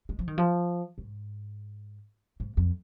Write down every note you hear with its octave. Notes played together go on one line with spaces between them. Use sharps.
G#3
F3
D#3
F3
G#2
G#2
F2